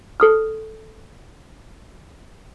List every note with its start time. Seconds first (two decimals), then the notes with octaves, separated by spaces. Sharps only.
0.20 A4 D#6 F6